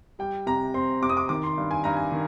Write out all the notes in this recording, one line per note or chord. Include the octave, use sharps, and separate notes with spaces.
G3 G5
C3 A#5
C4 C6
C3 D6
D#6
D6
D#3 D6
C6
G2
G#5
G2 A#5
G#5
D#3